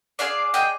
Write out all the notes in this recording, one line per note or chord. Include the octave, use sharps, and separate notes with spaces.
D4 G#4 D5 F5
D#5 G5